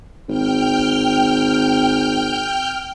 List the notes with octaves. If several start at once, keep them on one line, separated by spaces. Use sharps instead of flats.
G#1 G5 F6 G6